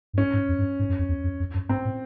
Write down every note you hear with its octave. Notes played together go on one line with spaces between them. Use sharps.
G2
G#2 C#4
G#2
F2
G2
G#2
F#2
F2
E2
F2
F2
F#2
G#2 C4
A2